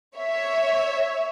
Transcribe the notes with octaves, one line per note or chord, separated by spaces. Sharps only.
C#5 E5